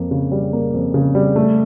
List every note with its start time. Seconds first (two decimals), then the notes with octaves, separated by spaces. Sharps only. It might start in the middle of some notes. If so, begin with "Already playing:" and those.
Already playing: F2 A#3
0.11 C#3
0.31 G3
0.53 A#3
0.73 F2
0.94 C#3
1.15 G3
1.36 A3